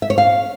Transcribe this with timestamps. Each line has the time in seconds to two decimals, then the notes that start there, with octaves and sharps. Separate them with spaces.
0.02 E5
0.10 C#5
0.18 F5